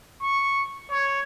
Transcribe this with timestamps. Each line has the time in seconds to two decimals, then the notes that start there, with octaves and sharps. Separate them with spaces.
0.22 C#6
0.91 C#5